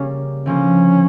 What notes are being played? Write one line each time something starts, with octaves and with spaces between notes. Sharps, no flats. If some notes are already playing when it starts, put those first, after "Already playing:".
Already playing: C#3 G3 A#3 C#4
D3 F3 A#3 C#4